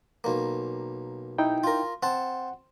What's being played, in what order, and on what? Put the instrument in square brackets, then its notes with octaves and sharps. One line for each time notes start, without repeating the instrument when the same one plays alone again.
[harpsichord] B1 A#3
[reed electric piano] D#4 E4 G5
[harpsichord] F4 A#4
[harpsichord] C4 A5 [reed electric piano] F#5